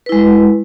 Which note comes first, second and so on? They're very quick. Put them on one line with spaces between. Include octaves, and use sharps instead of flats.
B4 E4 G#3